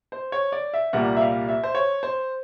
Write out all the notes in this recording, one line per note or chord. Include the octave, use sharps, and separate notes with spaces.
C5
C#5
D5
E5
C2 A#2 G3 A#3 F#5
E5
F5
E5
C5
C#5
C5